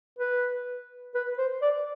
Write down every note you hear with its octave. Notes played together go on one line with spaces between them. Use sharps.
B4
B4
C5
D5